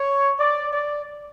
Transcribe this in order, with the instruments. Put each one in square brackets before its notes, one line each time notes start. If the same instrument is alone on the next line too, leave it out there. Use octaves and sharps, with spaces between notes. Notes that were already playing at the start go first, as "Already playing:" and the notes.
Already playing: [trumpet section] C#5
D5
D5